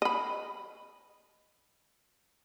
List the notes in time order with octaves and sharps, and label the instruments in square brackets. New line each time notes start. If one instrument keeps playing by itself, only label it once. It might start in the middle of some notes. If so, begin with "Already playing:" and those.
[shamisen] D#5 B5